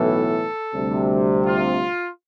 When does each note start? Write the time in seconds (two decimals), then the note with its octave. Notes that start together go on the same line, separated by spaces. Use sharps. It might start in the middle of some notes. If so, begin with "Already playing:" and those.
Already playing: B1 A2 E3 B3 A4
0.75 D2 C3 G3
1.45 F4